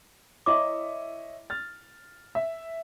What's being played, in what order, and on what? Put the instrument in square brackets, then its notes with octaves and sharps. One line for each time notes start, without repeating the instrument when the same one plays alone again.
[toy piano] E4 C6 D6 [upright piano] C#5 D#5 E5
[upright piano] F6 A6
E5